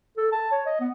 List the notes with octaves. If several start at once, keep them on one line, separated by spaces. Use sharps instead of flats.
A4
A5
C#5
D#5
B3